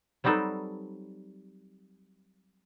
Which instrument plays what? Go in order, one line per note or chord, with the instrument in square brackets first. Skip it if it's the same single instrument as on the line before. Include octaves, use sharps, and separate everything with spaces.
[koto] F#3 G3 C4 D#4 A4 B4